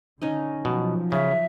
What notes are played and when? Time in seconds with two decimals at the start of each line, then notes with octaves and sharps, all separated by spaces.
0.22 D3 C#4 D#4 D#5
0.65 B2 F3 F#3
1.12 C#3 E5